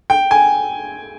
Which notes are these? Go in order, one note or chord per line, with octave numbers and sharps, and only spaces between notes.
G5
G#5